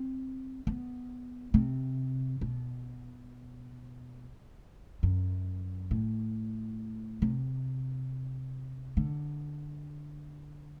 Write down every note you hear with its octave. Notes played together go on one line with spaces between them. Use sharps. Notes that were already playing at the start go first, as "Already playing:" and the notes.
Already playing: C4
B3
C3
B2
F#2
A2
C3
D3